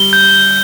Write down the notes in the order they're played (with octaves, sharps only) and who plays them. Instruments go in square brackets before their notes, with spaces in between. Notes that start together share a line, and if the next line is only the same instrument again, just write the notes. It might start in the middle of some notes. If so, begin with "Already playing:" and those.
Already playing: [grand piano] G3 [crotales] G7
[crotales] G6